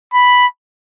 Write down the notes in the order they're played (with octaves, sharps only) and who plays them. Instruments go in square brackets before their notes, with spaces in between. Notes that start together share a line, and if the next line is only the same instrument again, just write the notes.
[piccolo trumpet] B5